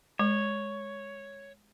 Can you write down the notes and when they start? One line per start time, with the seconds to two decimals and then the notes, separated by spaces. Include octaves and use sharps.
0.19 G#3 C#5